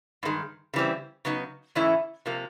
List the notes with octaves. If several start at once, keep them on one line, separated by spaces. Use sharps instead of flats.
G2 D#3 G#3
C#3 E3 G3 C4
C#3 F#3 B3 D#4
G#2 E3 A3 C#4 E4
C3 F3 A#3